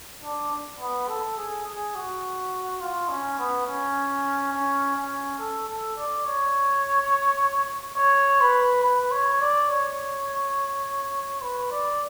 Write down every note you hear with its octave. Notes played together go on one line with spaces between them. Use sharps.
D4
B3
A4
G#4
G#4
F#4
F4
C#4
B3
C#4
C#4
C#4
A4
A4
D5
C#5
C#5
B4
B4
C#5
D5
C#5
B4
D5